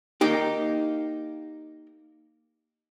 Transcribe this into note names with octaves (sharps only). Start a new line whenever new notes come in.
A#3 D#4 G4